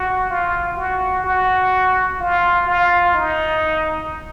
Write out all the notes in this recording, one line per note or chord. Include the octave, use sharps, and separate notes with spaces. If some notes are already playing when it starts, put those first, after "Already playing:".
Already playing: F#4
F4
F#4
F#4
F4
F4
D#4